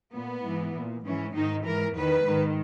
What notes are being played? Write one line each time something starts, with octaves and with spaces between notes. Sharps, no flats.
A#2 B3
G#2 E3
A#2
G#2 E3 C#4
G#2 D#3 D#4
G#2 E3 A#4
E2 D#3 B4
G#2 D#3